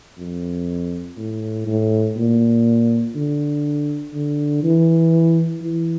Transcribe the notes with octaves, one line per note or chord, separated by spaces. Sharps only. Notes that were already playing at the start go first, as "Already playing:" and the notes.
F2
A2
A2
A#2
D3
D3
E3
E3